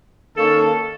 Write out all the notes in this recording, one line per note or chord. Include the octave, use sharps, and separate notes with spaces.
D#3 A#3 C#4 A4